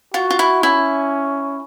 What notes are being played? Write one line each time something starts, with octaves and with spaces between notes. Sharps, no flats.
F4 F#4
F4
E4
C#4 E4